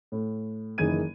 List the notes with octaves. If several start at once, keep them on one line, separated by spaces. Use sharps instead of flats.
A2
F#1 D#3 E3 G#4 G#6 D#7